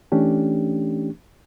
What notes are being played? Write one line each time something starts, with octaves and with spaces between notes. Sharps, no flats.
E3 A3 C#4 D4 G4